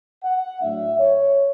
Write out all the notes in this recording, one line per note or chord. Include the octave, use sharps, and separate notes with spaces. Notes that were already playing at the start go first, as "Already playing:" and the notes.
F#5
A2 F#3 A3 D4 E5
C#5